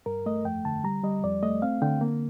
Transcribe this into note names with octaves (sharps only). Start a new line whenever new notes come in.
G2 A#4
A3 D#5
F2 G5
D3 A5
G3 A#5
G3 D#5
F2 D5
A3 D#5
C4 F5
D3 G5
A#3